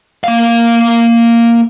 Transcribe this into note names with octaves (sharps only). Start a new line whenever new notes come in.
A#3 F5